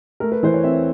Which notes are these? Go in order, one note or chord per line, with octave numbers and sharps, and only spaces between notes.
A3 A#4
B4
E3 C5
C#5
C4 E5